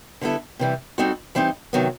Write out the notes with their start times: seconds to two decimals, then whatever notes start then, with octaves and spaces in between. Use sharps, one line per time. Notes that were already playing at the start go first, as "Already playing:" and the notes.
0.21 D3 G3 B3 E4 A4
0.59 C3 E3 G3
0.98 G3 C4 D#4 F#4 A4
1.35 E3 G3 C4 D#4
1.73 C3 D#3 F#3 B3